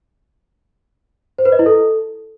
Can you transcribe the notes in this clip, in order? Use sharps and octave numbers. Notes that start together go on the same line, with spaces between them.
C5
B4
D#5
E4
A4